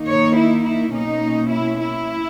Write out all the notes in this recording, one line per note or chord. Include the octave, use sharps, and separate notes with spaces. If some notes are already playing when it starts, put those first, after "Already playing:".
Already playing: D#3 A#3 D#4
C#5
E4
E4
B2 A#3 C#4 D#4
E4
E4